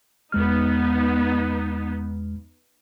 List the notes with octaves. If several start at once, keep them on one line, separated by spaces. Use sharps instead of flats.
E2 G#3 B3 D#4 F6